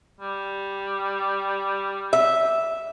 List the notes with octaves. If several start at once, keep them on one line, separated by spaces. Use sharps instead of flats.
G3
E5